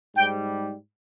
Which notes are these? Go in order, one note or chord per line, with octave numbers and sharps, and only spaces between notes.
G#2 G3 G5